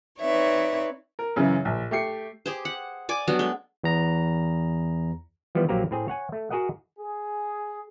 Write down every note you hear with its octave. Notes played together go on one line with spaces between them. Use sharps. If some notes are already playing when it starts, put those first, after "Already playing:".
C4 D#4 B4 C#5 D5 E5
A#4
F#2 C#3 E3
A#1
A3 G4 C7 C#7
G4 G#4 C5
F#5
D5 G#5 D6
F#3 G3 B3 D4
G#3 A3
E2 A#5
E3 F3 G3 B3
A#1 F#3 A#3 C4 G4 A#5
A2 C4 G#4
C#5 F#5 G#5
A3
F#4 G#4 A#4 D#5 F#5
G#4